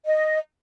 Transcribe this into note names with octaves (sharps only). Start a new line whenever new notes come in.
D#5